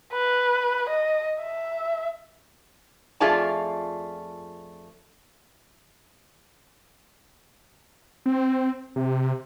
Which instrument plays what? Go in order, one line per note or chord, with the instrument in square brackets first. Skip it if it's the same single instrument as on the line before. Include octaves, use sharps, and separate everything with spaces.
[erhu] B4
D#5
E5
[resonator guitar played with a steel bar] F2 A3 F4 G#4 D5 A5
[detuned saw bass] C4
C3